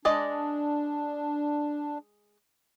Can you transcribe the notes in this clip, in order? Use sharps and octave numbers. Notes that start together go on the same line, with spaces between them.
G#3 D4 D5 D#5